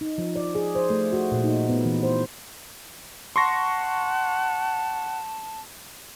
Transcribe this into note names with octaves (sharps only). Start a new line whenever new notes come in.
D#4
F3
D5
G#4
C5
A3
F#4
A#2
D#4
B3
E3
C5
F#5 A5 C6 C#6 A#6